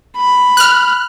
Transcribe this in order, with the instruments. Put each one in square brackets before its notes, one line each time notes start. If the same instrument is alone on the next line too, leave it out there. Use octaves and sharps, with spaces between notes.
[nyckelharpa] B5
[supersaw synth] F6 F#6